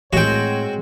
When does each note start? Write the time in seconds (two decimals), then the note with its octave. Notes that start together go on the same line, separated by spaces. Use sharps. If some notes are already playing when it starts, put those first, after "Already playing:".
0.13 A2 G#3 C4 F#4 C#5 G5